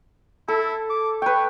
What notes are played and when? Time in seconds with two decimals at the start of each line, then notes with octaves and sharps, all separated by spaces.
0.48 E4 A4
0.90 D6
1.22 B4 C#5 G5